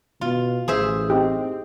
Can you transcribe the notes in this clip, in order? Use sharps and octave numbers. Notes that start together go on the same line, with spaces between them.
B2 F4
A1 G#4 C5 E5
C4 D#4 G4